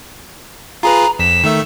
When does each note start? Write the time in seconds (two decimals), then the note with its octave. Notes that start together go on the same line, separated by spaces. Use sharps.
0.83 F4 G#4 B4 A#5
1.19 F2 B6 E7
1.44 D#3 A3 E5